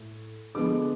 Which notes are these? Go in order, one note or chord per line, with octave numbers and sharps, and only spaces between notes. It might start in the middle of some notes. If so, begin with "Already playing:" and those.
Already playing: A2
D3 F3 G#3 B3 D6